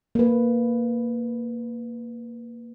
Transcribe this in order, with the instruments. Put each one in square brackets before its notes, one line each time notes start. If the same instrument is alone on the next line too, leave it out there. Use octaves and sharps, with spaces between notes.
[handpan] A#3 B4